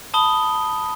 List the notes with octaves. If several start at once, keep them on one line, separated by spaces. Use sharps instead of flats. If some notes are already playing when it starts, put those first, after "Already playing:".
A5 B5 D#6 G7